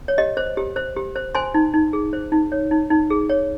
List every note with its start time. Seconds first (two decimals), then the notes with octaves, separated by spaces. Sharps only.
0.08 C#5
0.18 G4 D#5
0.37 C5
0.57 G4
0.76 C5
0.97 G4
1.16 C5
1.35 C5 G#5 C6
1.54 D#4
1.74 D#4
1.93 G#4
2.13 C5
2.32 D#4
2.52 C#5
2.71 D#4
2.90 D#4
3.10 G#4
3.30 C#5